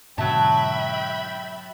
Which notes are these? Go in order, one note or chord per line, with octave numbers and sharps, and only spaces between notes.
G#2 B2 D3 F#3 E5 G5 A5 B5